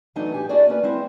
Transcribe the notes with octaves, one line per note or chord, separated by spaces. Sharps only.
E3 F#3 A3 B3 D4 D#4
A2 G4 G#5
D4 E4 F#4 G#4 D5 D#5
A#3 B3 C#4 B4
G#3 C4 E4 C5